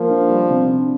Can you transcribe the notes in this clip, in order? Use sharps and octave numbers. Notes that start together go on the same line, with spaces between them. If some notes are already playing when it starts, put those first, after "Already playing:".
Already playing: F3 A#3
D4
G3
C3
D4